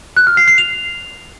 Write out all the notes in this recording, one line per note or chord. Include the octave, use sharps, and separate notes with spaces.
F#6
F6
C7
C7
F7